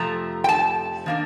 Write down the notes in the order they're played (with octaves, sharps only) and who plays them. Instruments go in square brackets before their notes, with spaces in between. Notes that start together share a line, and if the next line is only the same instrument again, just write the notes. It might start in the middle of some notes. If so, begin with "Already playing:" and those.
Already playing: [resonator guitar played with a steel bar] F2 C3 F3 A3 A#5
G5
A5
D#3 A#3 D4